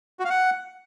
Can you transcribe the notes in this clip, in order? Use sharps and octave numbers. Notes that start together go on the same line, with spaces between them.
F#4
F5
F#5